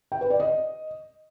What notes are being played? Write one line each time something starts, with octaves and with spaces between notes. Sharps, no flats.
G5
B4
D5
D#5